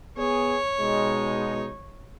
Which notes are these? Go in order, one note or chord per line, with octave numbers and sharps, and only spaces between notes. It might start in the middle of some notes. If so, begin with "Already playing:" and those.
B3 G#4 C#5
B2 G#3 D#4